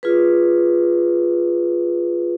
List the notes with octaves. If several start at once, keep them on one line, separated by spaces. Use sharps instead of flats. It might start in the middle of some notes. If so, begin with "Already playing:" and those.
F4 G#4 B4